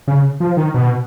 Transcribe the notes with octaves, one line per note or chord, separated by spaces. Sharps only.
C#3
F3
D#3
B2